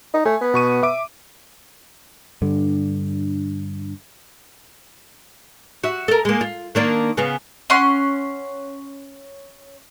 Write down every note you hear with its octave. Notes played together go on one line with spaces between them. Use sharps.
D#4
A3 G#5
B3
B2 C#6 D#7
E5 D6 D7
G2 D3
F#4 E5
A4 A#4
G#3 A#3
F4
D#3 A#3 D4
C#3 B3 F4
C#4 F#5 C6